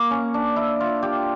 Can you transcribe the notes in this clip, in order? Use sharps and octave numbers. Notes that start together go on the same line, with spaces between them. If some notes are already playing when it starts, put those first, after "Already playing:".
Already playing: A#3
C#4
D4
E4
F4
G4